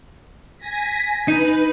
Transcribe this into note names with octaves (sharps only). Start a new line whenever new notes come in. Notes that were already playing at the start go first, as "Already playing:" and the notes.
G#5 A#6 B6
D#4 B4